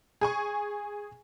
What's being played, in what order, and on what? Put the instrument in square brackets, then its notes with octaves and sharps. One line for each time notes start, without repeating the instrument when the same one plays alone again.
[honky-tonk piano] G#4 G#5 C#6